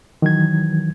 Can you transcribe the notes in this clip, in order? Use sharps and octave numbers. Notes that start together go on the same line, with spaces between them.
D#3 E3 F#3 G#6